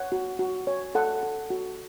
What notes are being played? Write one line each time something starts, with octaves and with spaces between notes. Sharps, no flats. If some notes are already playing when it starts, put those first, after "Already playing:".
Already playing: C#5 F#5
F#4
F#4
C#5
A4 F#5
A4
F#4